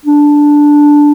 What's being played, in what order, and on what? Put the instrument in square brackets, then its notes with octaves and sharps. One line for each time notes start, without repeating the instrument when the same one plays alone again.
[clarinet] D4